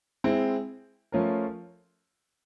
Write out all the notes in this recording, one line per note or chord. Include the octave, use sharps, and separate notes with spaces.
G#3 C4 E4
F3 A3 C#4 F4 A#4